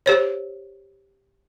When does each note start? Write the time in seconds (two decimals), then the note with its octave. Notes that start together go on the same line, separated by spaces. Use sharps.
0.06 G4 C5 C#5